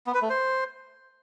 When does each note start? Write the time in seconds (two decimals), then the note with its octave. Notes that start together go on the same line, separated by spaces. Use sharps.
0.07 B3
0.14 B4
0.22 A3
0.30 C5